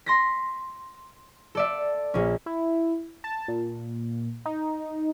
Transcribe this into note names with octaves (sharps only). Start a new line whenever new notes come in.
C6 A#6 B6
A4 D5 E5
A#1 C#4
E4
A5
A#2
D#4